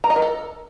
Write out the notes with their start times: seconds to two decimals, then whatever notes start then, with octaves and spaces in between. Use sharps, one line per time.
0.04 A#5
0.10 D#5
0.16 A#4
0.22 A4